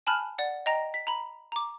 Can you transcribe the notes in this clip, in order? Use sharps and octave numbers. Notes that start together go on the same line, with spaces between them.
G#5 A5 B5 F6 F#6
D5 F#5
D#5 G5 A#5 A#6
B6
A#5 B5
A#5 D6